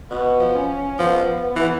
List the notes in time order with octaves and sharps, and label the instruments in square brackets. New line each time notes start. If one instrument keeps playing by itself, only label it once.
[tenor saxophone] B2 [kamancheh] B3
[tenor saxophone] F3
[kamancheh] C#4
[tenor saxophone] F3 [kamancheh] B3
[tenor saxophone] E3